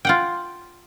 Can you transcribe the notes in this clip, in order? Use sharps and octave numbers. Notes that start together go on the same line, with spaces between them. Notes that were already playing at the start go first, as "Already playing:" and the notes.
F4 F#5 G5